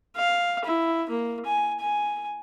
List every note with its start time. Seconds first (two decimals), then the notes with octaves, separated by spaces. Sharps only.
0.16 F5
0.65 E4
1.10 A#3
1.45 G#5
1.80 G#5